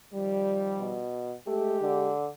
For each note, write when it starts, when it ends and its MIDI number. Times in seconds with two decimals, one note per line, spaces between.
0.14 1.02 51
0.14 1.02 53
0.14 1.02 55
0.79 1.34 47
1.47 2.12 56
1.47 1.77 57
1.47 2.12 67
1.82 2.28 50